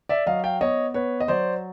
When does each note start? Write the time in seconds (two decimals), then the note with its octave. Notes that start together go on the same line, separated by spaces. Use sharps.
0.09 D5 E5
0.26 F#3 D#5 F5
0.44 F5 G5
0.61 B3 C#5 D#5
0.94 B3 B4 C#5
1.20 D#5
1.28 F#3 C5 D5